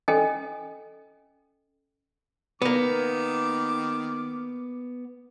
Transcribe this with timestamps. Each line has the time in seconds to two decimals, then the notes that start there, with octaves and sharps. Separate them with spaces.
0.08 C#4 A4 D#5 G5 G#5
2.62 D#3 A#3 B3 D6